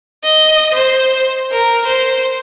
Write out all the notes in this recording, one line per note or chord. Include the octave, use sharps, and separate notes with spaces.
D#5
C5
A#4
C5